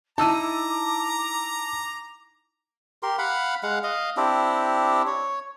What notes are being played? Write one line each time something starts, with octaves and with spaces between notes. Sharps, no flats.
D#4 E4 A5 A#5 D6 E6 D#7
G4 A#4 C6
F5 F#5 B5
G#3 F5 F#5
D#5 F5
C4 D4 E4 G4
C#5